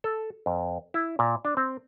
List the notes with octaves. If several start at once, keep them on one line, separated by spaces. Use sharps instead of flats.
A4
F2
E4
A#2
D4
C4